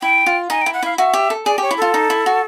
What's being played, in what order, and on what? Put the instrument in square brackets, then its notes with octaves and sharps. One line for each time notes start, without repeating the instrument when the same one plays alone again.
[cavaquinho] E4 [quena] G5
[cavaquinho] F4
[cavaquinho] D#4 [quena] G#5
[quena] G5
[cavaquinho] E4
[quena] F#5
[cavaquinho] E4 [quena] F5
[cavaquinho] F#4 [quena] E5
[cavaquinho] G4
A4
[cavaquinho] G#4 [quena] D5
[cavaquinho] G4 [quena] C#5
[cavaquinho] E4
[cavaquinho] F4 [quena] A4
[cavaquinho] D#4
E4
F#4